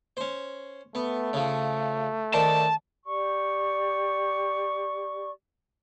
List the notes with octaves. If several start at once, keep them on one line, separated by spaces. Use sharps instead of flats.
C#4 C5
A3 B3
C#3 F3
D#3 D4 C5 A5
G4 D5 C#6